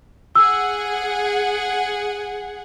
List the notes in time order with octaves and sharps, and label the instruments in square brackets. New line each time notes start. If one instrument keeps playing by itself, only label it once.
[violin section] G#4 F#5 [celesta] E6